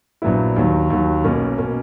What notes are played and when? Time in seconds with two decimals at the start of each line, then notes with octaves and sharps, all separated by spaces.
0.22 A#1 A#2 F#3 B3 E4
0.56 D#2 D#3 F#3
0.90 D#2 D#3 F#3
1.24 B1 B2 A#3 C#4
1.58 B2 A#3 C#4